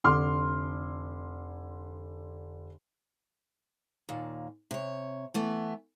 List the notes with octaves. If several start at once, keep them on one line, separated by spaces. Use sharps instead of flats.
F1 D3 C6 D6 F6
D#2 A#2
C3 C#5
E3 A3 B3